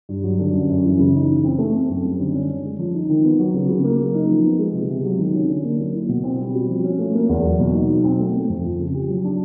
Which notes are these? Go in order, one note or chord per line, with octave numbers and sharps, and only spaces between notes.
G2
F#3
D3
F#2
F#2
E3
C#3
D#4
E3
C4
A3
C4
F#2
G3
D3
C#4
D3
G#3
F3
D#4
D#3
B3
F#3
C#3
C#3
A#3
F#3
D#4
F3
B3
G#3
C3
C3
F#3
D#3
C#4
D3
A#3
F#3
E4
B2
C4
G3
F#4
F3
C#4
A3
A#3
E2
F#3
B2
D#4
F#3
C4
A3
A3
F2
F3
C#3
G4
F#3
D4